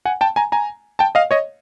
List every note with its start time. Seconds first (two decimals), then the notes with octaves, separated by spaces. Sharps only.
0.05 F#5 G#5
0.21 G5 A5
0.36 G#5 A#5
0.52 G#5 A#5
0.99 G5 A5
1.15 D#5 F5
1.31 C#5 D#5